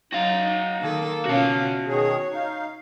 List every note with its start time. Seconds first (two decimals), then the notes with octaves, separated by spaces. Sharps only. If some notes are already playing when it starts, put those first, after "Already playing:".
0.12 F#3 D#4 F#4 F5
0.81 D#3 A#3 A4
1.26 B2 C#4 F4 F#4 A5
1.87 B2 D#3 G#4 C#5
2.32 D#4 F5